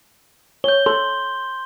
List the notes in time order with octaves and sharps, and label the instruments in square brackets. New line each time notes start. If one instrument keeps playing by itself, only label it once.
[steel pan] C#5 [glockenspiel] G6 G7
[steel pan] A4 [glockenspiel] C6